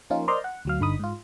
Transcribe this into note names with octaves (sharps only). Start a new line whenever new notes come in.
F3 A#3 C#4 D#4 F4
A#4 C5 D5 D#5 A#5 C6
F#5
D2 F#3 F5
G1 D3 D#4 B5 D#6
G#2 F4